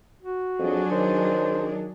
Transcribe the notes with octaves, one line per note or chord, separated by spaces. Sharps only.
F#4
F2 F#3 D4 G#4
D#3 C5